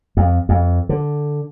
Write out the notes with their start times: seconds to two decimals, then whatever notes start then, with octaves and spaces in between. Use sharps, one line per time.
0.17 F2
0.49 F2
0.89 D3